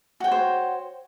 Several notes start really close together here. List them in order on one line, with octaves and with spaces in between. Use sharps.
F#4 G5 C#5 C5